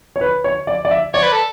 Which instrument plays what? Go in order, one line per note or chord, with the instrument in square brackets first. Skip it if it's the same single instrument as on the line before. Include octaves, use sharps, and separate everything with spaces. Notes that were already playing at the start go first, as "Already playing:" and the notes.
[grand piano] C#5
B4
C#5
D5
D5
E5
[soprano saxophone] C#5 [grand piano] D5
[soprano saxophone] B4
A4